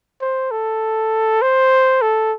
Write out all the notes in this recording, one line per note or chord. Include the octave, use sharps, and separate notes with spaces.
C5
A4
C5
A4